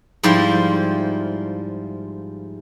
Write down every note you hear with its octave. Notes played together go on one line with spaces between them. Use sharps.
G#2 F3 G3 E4 F4